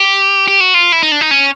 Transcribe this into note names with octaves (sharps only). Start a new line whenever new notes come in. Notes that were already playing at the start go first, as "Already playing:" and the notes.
Already playing: G4
G4
F#4
F4
E4
D#4
D4
D#4
C#4